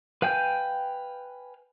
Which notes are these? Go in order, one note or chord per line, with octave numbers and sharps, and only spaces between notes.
B4 F5 G5 G#5 G6